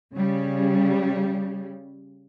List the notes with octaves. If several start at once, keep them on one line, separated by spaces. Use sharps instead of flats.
C#3 G3